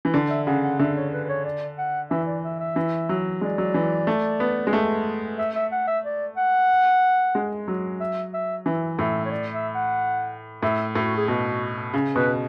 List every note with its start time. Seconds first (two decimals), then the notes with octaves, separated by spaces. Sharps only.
0.05 E3
0.14 D3 D5
0.30 E5
0.47 C#3 F#5
0.63 F#5
0.79 D3 E5
0.96 C#5
1.13 B4
1.24 B4
1.29 C#5
1.45 D5
1.78 F#5
2.10 E3 E5
2.27 D5
2.44 E5
2.60 E5
2.76 E3
3.09 F#3
3.41 G#3 D5
3.58 F#3
3.74 E3
4.07 A3
4.40 B3
4.67 G#3
4.73 A3
5.38 E5
5.55 E5
5.72 F#5
5.88 E5
6.04 D5
6.37 F#5
7.35 G#3
7.68 F#3
8.00 E5
8.34 E5
8.66 E3 E5
8.99 A2 E5
9.25 C#5
9.31 D5
9.53 E5
9.75 F#5
10.63 A2 E5
10.95 A2 F#4
11.17 G#4
11.28 B2 F#4
11.94 C#3
12.15 B2 B4